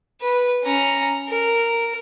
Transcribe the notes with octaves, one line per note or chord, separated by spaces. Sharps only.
B4
C#4 A#5
A#4